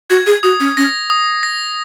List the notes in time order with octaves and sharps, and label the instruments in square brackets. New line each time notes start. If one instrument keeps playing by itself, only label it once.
[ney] F#4 [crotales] G#6
[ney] G#4
[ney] F#4 [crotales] D#6
[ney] C#4
[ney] C#4 [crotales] A#6
[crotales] D#6
A#6